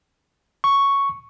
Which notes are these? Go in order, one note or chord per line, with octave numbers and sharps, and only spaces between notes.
C#6